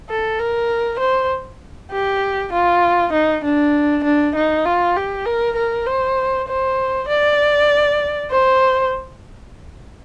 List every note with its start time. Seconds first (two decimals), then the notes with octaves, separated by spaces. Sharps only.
0.09 A4
0.39 A#4
1.00 C5
1.92 G4
2.53 F4
3.13 D#4
3.44 D4
4.04 D4
4.36 D#4
4.66 F4
4.97 G4
5.26 A#4
5.57 A#4
5.87 C5
6.48 C5
7.09 D5
8.31 C5